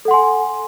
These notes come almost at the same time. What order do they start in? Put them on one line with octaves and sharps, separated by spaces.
A4 F#5 C6 G#5